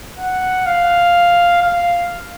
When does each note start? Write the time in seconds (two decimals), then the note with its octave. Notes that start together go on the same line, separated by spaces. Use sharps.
0.19 F#5
0.66 F5
1.62 F5